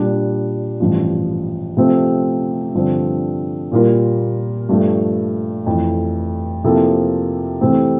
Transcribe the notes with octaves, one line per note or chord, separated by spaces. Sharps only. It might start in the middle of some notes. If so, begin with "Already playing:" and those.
Already playing: A#2 G3 D4
A1 G2 F3
C3 F3 A3 C4
G2 D3 F3 C4
A#2 G3 A#3 F4 A#4
G2 F3 A3
F2 E3 A3
C3 F3 A#3 E4 A4
C3 E3 A3 C4